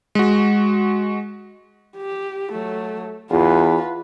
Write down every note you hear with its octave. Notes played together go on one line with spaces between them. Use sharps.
G#3 F#4
G4
F#3 A3
E2 F4 B4